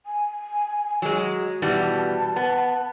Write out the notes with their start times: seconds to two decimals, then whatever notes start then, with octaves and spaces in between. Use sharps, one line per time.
0.06 G#5
1.02 F#3 G#3
1.62 B2 E3 G3 A5
2.36 B3